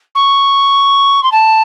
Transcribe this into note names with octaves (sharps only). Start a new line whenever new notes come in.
C#6
C6
A5